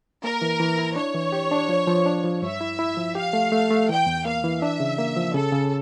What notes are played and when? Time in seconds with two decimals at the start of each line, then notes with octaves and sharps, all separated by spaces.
0.24 A#3 A#4
0.42 E3
0.60 E3
0.78 E4
0.96 D4 C#5
1.15 E3
1.32 G4
1.51 D4
1.69 F3
1.87 F3
2.06 D4
2.24 F3
2.42 G2 E5
2.61 E4
2.79 E4
2.97 F3
3.15 G4 F5
3.33 A3
3.52 A3
3.71 A3
3.89 E3 G5
4.06 E2
4.25 A#3 F5
4.44 E3
4.62 D4 E5
4.80 C#3
4.98 A#3
5.16 F3
5.34 C#3 A4
5.52 C#3